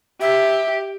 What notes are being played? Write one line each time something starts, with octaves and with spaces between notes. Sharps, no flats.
G4 E5